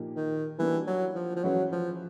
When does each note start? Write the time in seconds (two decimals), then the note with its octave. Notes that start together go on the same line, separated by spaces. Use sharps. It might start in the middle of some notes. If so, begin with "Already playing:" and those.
Already playing: A#2 F3 A#3 D#4 G4
0.16 D#3
0.59 E3 G3 A#3 D4 F#4
0.87 F#3
1.15 F3
1.36 F3
1.43 E3 F#3 G#3 C#4 F#4 B4
1.72 F3